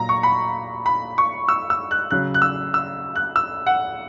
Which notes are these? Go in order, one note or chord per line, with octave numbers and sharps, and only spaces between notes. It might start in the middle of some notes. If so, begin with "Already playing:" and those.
Already playing: A#2 F#3 A#5
C#6
B5
B5
C#6
E6
E6
F#6
C#3 F#3 F#6
F#6
E6
E6
F#6
E6
F#5